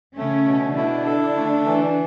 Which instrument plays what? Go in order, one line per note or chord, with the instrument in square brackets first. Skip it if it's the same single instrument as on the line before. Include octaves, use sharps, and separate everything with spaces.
[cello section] C#3 C#4 [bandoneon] A3
[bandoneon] B2
[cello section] D3 D4 [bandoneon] E4
[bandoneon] A4
A3
E3